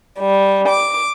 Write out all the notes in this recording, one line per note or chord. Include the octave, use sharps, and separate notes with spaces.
G3
D6